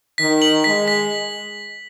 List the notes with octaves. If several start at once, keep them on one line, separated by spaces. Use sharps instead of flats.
D#3 B6
F#7
G#3 B6
B6